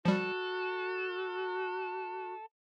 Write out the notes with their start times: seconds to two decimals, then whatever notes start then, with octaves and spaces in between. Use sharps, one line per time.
0.05 F3 G3 F#4 A4